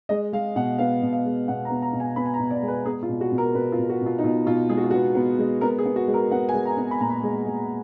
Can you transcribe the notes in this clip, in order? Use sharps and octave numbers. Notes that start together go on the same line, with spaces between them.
G#3 D#5
G#3 F5
B2 F#5
B3 F5
B2
F5
G#3
B2 F#5
A#5
B3
A#5
B2
G#5
B3 B5
G#5
A#5
B2
D5
G#3
B4
B3 G#4
F4
B2
F#4
B2
A#4
B2 B4
F4
B2
F#4
B2 F4
D#4
B2 F4
B2 F4
G#3 G#4
F#4
F4
B3 F#4
B3
G#3
B3 A#4
G#4
B3
F#4
G#3
A#4
B3 F#5
G#5
G#3
A#5
B3
B5
A#2 A#5
B5
G#3
G#3